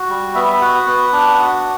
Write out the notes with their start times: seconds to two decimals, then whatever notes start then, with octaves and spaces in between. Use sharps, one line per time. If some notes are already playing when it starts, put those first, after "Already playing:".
Already playing: F#4
0.09 G3
0.35 B3 E5
0.61 F#4 F#5
0.86 B3
1.13 D4
1.39 F#4